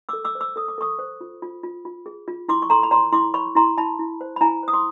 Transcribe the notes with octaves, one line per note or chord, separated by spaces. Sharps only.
D6 E6
A4
D6 E6
C5
D6 E6
A4 D#6
D6
A4 C#6 D#6
C5
F4
F4
F4
F4
G#4
F4
E4 C6 D6
C#6
A4 A#5 C6
B5
C#5 A#5 C6
E4 C6 D6
C#5 B5 C#6
E4 A#5 C6
E4 A5 B5
E4
C5
B5
E4 G#5 A#5
C5 D#6
C6 D6